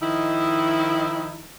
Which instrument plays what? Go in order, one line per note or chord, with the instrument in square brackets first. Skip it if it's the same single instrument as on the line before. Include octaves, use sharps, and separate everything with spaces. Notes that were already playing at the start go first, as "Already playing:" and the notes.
[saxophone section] D#3 F3 D#4 E4